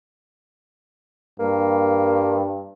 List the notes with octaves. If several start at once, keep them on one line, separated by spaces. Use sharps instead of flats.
G2 A#3